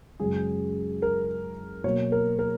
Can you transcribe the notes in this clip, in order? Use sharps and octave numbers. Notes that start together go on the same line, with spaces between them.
F#2 C#3 G#3 G#4
A#4
B2 F#3 A#3 C#5
A#4
A#4